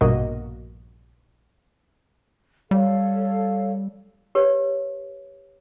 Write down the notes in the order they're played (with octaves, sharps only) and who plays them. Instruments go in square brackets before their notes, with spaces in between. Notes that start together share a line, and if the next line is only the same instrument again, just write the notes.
[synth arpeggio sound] A#1 G2 B2 A#3 F#4 D#5
[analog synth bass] G3 [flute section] A4 C#5 F5
[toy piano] G4 B4 C#5